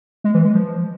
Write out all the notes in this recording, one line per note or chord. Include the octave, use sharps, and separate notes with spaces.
G#3
E3
G#3
F3